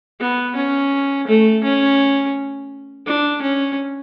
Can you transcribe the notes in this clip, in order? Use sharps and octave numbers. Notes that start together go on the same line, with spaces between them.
B3
C#4
A3
C#4
D4
C#4